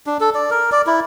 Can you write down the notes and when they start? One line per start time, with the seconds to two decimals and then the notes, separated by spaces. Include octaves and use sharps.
0.06 D4
0.20 A4
0.34 D5
0.50 A#4
0.72 D5
0.87 E4